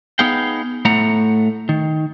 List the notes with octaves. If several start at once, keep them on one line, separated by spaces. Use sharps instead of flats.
B3 D#4 G#4 F5 G5
A2 A3 F#5 A#5
D#3